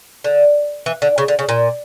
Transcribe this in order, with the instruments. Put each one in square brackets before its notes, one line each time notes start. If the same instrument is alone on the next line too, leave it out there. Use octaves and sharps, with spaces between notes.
[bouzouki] D3
E3
D3
C#3
D3
C#3
A#2